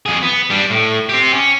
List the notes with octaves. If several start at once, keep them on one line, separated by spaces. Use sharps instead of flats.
F2 G#4
B3
G3 D4
A2
C4 G4
C#4